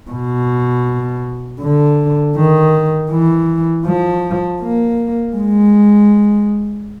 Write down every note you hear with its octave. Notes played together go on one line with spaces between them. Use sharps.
B2
D3
D#3
E3
F3
A#3
G#3